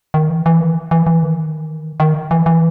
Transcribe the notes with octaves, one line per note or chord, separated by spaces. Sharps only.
D#3
E3
E3
D#3
E3
E3
D#3
D#3
E3
E3